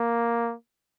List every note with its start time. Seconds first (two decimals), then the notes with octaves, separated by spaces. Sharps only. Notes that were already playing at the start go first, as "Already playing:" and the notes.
Already playing: A#3